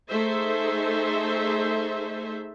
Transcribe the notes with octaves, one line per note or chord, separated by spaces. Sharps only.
A3 D#4 G#4 A4 C5 E5